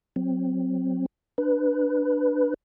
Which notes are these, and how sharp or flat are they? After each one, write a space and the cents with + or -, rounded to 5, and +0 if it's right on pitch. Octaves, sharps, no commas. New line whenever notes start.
F#3 +0 C4 +0
D4 +10 B4 +0